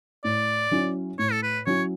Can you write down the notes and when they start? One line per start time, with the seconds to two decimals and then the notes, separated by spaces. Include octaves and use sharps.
0.24 A2 D5
0.71 F#3 C#4 E4
1.19 A2 C#5
1.32 A4
1.43 B4
1.66 F#3 C#4 E4 C#5